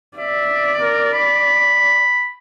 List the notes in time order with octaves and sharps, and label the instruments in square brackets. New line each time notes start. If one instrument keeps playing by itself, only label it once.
[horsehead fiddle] D5 [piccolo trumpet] E5
[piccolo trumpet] A#4
B5